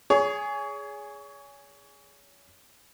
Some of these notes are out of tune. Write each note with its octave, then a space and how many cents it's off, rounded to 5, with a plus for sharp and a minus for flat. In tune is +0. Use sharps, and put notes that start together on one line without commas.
G#4 +0 C#5 +30 C#6 +0